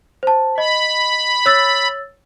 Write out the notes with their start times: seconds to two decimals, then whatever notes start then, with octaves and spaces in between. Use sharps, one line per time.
0.23 C5 A5
0.58 D#5 B5
1.46 C#5 E6 A6